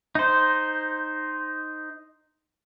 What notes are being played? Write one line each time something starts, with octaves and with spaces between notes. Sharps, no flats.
D#4 C5